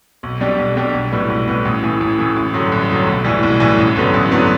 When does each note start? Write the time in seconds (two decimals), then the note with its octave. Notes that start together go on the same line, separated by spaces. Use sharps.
0.23 B1
0.41 B2 G3 D4 G4
0.58 B1
0.76 B2 G3 D4 G4
0.94 B1
1.12 A2 G3 B3
1.30 B1
1.47 A2 G3 B3
1.65 A1
1.83 A2 E3
2.01 A1
2.19 A2 E3
2.36 A1
2.53 G2 D3 F#3
2.72 A1
2.90 G2 D3 F#3
3.07 B1
3.25 A2 E3 G3
3.43 B1
3.60 A2 E3 G3
3.78 A1
3.96 G2 D3 F#3 B3
4.14 A1
4.31 G2 D3 F#3 B3